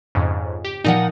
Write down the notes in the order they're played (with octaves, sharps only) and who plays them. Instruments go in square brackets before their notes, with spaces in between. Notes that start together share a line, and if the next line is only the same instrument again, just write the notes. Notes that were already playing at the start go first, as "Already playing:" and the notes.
[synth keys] F2 G#2 C#3
G4
[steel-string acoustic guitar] A#2 F3 F#5 [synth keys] D#4